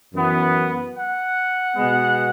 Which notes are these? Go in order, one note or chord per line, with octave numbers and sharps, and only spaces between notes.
F#2 E3 B3
F#5
B2 G#3 B3